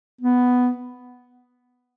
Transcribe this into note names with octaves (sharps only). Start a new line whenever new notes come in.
B3